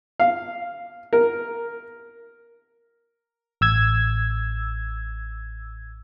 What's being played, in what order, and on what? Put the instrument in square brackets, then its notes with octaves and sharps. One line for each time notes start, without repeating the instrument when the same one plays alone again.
[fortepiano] F5
A#4
[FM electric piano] A1 E6 G#6